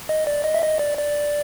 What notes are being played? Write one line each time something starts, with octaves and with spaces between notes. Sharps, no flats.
D#5
D5
D#5
E5
D#5
D5
D5